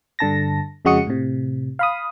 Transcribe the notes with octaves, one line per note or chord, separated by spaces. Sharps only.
G2 D3 A5 A#6
F2 C#3 G#3 F#4 D#6 C#7
A2 C3
F5 B5 D#6